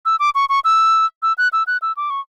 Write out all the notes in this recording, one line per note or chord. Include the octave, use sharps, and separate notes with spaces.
E6
D6
C#6
C#6
E6
E6
F#6
E6
F#6
E6
D6
C#6